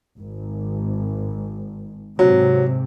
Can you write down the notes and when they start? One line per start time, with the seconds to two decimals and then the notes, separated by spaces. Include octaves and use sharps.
0.19 G#1
2.19 G#2 C3 F#3